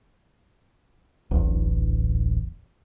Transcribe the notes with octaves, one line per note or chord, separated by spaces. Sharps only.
D1 A1 E2